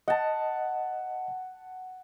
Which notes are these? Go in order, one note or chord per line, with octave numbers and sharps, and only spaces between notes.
D#5 F#5 A5